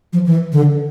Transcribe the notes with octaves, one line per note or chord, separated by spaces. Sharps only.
F3
E3
D3